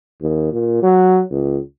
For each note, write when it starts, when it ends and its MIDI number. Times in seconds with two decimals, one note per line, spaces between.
0.21 0.48 39
0.53 0.79 46
0.83 1.22 54
1.31 1.58 37